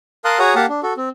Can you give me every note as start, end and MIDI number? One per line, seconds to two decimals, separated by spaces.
0.25 0.39 70
0.25 0.39 77
0.25 0.39 81
0.25 0.39 84
0.25 0.39 87
0.25 0.39 90
0.39 0.54 66
0.39 0.54 68
0.39 0.54 73
0.39 0.54 78
0.39 0.54 82
0.39 0.54 87
0.55 0.66 58
0.55 0.66 67
0.55 0.66 77
0.55 0.66 78
0.55 0.66 81
0.69 0.81 62
0.83 0.93 66
0.83 0.93 69
0.97 1.09 60